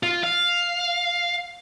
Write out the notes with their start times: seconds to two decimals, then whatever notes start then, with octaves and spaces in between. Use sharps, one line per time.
0.03 F4
0.23 F5